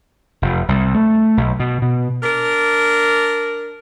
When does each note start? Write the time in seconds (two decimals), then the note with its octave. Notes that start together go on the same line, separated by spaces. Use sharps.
0.42 F1
0.68 C2
0.94 A3
1.37 B1
1.60 B2
1.82 B2
2.23 D4 A#4